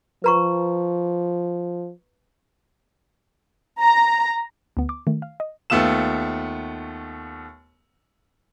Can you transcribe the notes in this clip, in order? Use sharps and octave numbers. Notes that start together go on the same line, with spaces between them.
F3 B4 A#5 C#6
A#5
D2 B3
D6
D#3 A3
F5
D#5
D#2 A3 B3 F4 E6 E7